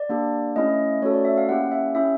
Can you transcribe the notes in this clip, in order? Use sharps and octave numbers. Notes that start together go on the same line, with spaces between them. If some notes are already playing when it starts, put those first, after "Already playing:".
Already playing: D5
A#3 D4 G4
A3 C#4 E4 D#5
A3 C#4 F#4 A4 C#5
D5
E5
F5
A#3 C#4 E4 G4 F#5
E5
C#4 E4 G4 E5